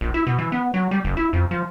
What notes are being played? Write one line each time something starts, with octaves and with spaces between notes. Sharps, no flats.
A#1
E4
B2
E3
B3
F#3
G3
F#1
E4
F2
F3